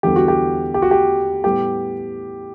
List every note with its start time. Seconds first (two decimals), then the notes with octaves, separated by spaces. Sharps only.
0.03 E2 D3 G3 B3 G4
0.16 F#4
0.28 G4
0.74 G4
0.82 F#4
0.91 G4
1.44 A2 G3 B3 G4